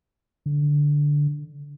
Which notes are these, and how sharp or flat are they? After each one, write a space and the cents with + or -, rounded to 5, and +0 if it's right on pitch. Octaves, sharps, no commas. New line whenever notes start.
D3 -5